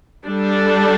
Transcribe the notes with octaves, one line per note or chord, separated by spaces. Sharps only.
G3 D4 A4